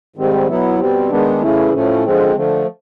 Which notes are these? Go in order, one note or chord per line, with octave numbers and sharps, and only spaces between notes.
G#2 D#3 G3 C4
B2 F#3 B3 E4
B2 G3 C4
D#3 G#3 B3 D4
C#3 E3 A3 C#4 E4
A2 F3 A3 C#4
D3 F3 G#3 C4
D3 F3 A3